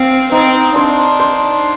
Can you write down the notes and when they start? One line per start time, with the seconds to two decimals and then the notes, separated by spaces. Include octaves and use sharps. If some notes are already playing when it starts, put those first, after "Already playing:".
Already playing: C4 F5
0.31 C4 D#4
0.75 D4 C5
1.19 C5